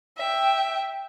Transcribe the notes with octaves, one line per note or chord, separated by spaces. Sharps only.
E5 G5